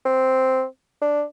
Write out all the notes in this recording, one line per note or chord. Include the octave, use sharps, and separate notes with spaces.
C4
D4